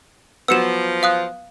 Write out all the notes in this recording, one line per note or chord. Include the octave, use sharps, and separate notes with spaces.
F3 F#3 B3 E6 C#7 E7
F5 D#6 F#6